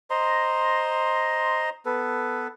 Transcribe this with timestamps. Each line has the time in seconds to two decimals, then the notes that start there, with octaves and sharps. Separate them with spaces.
0.10 C5 D#5 A#5 C6
1.86 B3 A4 B4